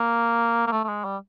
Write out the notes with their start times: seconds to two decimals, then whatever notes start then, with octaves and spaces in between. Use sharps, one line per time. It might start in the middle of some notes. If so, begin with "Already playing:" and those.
Already playing: A#3
0.67 A#3
0.72 A3
0.84 A3
0.89 G#3
1.05 G3